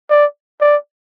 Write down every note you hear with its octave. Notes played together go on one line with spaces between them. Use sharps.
D5
D5